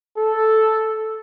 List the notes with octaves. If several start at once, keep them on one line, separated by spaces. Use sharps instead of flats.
A4